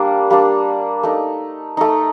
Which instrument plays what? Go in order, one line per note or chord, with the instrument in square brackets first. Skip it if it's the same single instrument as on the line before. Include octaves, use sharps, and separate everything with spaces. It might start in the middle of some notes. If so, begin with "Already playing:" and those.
Already playing: [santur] G3 A#3 D4
G3 A#3 D4
A3 D#4
A3 D#4